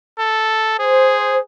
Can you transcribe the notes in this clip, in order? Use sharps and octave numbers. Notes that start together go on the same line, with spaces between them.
A4
G#4 C5